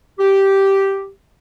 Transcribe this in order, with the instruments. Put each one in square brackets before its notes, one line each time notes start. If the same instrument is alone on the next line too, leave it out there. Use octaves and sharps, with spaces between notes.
[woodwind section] G4